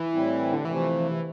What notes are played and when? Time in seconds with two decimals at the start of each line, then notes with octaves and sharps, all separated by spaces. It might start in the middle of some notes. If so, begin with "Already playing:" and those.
Already playing: E3
0.13 A2 G3 C4 E4
0.53 D3
0.65 C3 E3 F3 A3